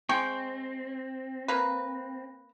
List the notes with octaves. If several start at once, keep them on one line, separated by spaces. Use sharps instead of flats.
G#3 C4 G5 C#6
A#3 B4